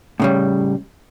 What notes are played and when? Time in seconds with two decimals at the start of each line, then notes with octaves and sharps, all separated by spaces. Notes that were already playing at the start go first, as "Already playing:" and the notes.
0.20 A2 C#3 G3